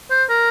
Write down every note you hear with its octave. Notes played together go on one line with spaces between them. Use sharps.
C5
A#4